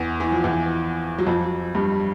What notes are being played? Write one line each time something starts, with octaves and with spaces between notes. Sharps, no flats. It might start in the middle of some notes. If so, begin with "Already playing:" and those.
Already playing: E2 E3
E3
F3
E2 E3
F#3
F2 F3
G2 G3